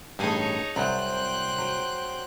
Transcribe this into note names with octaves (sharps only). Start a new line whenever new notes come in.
A1 G2 D#4 G#4 C#5 G#5 A5
C2 F#3 C5 F#5 G5 F#6
F#3